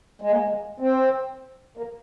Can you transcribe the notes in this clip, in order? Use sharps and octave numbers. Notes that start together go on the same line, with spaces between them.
G#3
A#3
G#3
C4
A#3